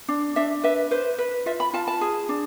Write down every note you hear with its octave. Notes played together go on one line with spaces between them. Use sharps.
D4
D4 E5
B4 E5
B4 C5
B4
F4 E5
B5
F4 A5
A5
G#4
D4